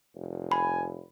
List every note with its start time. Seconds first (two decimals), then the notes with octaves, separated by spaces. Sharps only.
0.15 F1
0.52 G#5 B5